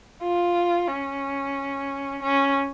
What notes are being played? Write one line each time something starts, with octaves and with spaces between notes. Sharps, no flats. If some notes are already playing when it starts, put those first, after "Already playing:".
F4
C#4
C#4